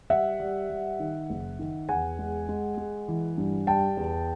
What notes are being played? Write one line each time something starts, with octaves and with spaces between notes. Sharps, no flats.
G3 E5 F#5
G3
G3
D#3
F#1
D#3
E2 F#5 G#5
G#3
G#3
G#3
E3
G2
G3 G5 A5
E2